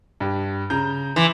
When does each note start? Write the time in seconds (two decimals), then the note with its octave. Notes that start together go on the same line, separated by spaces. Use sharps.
0.20 G2 G4
0.70 C#3 A#5 G6
1.16 E3 C6 D6